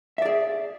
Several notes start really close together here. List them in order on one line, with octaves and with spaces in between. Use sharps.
E5 D5 G#4